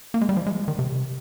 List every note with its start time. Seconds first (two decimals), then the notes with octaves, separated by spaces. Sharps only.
0.14 A#3
0.21 G#3
0.29 G3
0.37 F3
0.47 G#3
0.68 D#3
0.79 C3